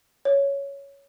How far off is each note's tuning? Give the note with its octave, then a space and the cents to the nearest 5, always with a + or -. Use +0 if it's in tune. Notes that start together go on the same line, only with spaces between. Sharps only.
C#5 +5